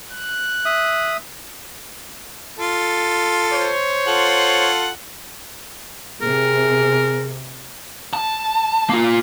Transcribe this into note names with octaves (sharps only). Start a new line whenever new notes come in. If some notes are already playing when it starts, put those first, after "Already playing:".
F#6
E5 D#6
F4 A4
C5 C#5
F4 A4 F#5
C3 G#4 A#4
A5
A#3 F4